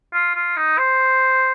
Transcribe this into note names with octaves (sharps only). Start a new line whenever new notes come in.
F4
F4
D#4
C5